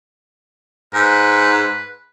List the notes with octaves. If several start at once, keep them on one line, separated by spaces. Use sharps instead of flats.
G#2 B4